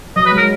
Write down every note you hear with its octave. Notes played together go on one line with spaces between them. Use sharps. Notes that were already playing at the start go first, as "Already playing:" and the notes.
F#3 D#5
B4
G#3
A#4